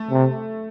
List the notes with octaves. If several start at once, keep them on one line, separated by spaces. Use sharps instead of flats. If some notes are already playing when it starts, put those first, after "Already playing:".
Already playing: A3
C3